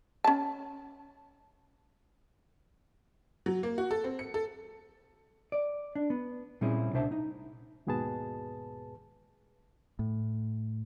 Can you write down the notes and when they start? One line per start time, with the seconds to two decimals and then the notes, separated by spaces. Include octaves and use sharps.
0.24 C#4 A5
3.46 F#3
3.63 A#3
3.78 F#4
3.91 A4
4.04 C4
4.19 C#7
4.34 A4
5.52 D5
5.95 D4
6.10 B3
6.61 A#2 G3 C4 C#4 E4 G#4
6.93 C2 B2 D4 C5 E5 A5
7.12 D#4
7.87 D#2 G#2 B2 G#4 B4 A5
9.99 A2